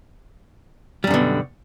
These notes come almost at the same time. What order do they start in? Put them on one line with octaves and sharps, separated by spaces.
G3 F#2 D3 B2